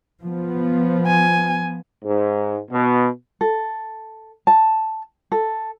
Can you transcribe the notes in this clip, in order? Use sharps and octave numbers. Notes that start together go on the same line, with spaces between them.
F3 B3
G#5
G#2
B2
A4
A5
A4